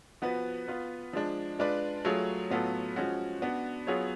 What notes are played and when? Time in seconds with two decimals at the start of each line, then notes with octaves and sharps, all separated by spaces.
0.22 F3 B3 F#4 B4
0.68 B3 F4 B4
1.13 F3 G#3 D4
1.59 G#3 D4 F4 B4 D5
2.05 F#3 A3 F4 G#4 C#5
2.50 A2 F#3 B3 F4 A4
2.96 F3 G#3 C#4 F#4
3.42 B3 D4 F#4
3.87 F#3 B3 F4 G#4 C#5